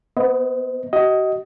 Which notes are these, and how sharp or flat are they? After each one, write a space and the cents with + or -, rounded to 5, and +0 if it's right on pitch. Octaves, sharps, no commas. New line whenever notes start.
B3 +0 C5 -35 D#5 +30
F#4 +40 D#5 +15